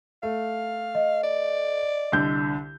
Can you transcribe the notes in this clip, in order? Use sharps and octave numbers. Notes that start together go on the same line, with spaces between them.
A3 F5
D#5
D5
C2 D3 G6